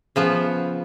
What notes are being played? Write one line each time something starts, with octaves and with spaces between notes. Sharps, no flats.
C#3 F3 B3